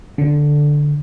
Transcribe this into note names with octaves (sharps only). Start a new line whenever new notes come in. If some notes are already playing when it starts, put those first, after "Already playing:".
D3